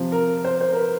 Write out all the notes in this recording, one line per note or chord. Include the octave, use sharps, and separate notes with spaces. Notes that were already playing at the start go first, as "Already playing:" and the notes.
Already playing: C3 F3
A#4
C5
C5
A#4
B4